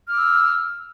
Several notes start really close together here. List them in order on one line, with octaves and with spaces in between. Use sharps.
F6 D6 E6